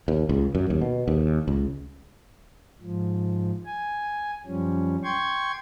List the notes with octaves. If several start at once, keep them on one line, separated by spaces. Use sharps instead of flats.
D#2
C#2
F#2
D#2
B2
D#2
C#2
G#2 F3
G#5
F#2 F3 G3 C#4
G5 C6 C#6 G#6